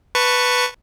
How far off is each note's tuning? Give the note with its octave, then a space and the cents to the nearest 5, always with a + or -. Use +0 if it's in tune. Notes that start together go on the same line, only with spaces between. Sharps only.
B4 +0 A5 +20 C#6 +0